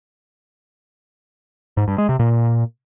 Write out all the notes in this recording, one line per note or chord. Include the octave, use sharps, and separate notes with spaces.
G#2
G2
G#3
C3
A#2